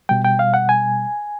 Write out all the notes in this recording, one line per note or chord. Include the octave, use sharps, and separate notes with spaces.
B2 G3 G5
G5
F5
F#5
G#5